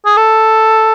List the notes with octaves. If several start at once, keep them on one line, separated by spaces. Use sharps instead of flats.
G#4
A4